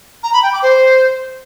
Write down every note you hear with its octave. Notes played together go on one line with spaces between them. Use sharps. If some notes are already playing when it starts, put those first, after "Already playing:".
A#5
B5
G5
D6
C5